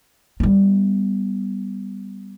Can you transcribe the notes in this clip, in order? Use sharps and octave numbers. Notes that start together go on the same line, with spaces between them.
G3 B3